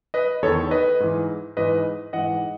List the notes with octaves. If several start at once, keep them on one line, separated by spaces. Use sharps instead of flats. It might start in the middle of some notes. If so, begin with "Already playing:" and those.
B4 D#5
E2 A4 C#5
D#3
B4 D#5
G#2 E3
G#2 E3 B4 D#5
G#2 E3 D#5 F#5